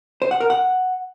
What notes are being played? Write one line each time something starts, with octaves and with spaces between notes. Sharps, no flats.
C5
F#5
A#4
F#5